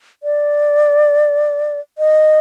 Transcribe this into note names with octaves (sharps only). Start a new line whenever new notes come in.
D5
D#5